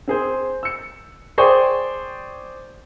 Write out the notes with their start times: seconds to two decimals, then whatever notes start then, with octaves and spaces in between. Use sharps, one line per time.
0.08 C4 G#4 C5
0.63 E6 C#7
1.38 G#4 C5 D5 G5 C#6 D#6